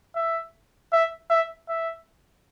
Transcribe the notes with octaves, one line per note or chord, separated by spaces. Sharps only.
E5
E5
E5
E5